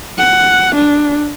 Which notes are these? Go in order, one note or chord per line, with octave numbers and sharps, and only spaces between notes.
F#5
D4